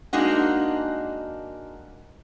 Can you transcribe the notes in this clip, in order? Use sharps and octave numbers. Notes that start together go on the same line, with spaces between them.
G#3 A#3 D4 D#4 F#4